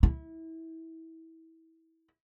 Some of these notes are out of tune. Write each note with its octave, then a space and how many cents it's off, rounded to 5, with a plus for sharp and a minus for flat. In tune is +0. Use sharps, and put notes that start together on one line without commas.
E4 -25